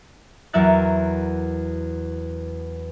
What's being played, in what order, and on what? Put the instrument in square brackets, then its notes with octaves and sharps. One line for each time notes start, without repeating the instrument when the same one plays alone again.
[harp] E2 F#3 A#4 E5 F#6 A6